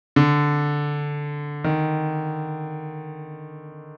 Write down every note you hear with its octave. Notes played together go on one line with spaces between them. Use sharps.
D3
D#3